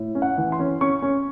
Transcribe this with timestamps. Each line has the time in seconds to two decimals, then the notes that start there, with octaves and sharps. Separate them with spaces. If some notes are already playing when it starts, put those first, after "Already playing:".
Already playing: A2
0.15 C#4
0.22 F#5
0.38 E3
0.52 C6
0.59 C#4
0.81 C#4 C#6
1.02 C#4